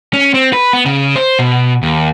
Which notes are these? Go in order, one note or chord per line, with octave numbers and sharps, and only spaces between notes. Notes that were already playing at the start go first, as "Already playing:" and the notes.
C#4
C4
B4
B3
C#3
C5
B2
D#2